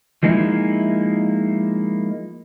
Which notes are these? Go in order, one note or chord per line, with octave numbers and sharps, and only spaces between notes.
F3 G#3 A#3 D#4 E4